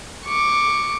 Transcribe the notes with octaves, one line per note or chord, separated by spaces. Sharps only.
C#6 D6